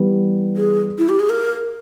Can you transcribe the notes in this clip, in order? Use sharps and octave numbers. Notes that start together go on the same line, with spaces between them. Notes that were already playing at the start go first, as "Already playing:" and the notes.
Already playing: E3 G3 B3
G#4
E4
G4
G#4
A#4